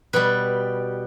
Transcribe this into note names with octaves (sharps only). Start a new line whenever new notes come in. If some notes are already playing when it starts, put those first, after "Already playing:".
B2 G3 B4